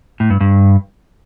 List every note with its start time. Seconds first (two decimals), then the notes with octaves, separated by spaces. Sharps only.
0.20 A2
0.30 G2
0.40 G2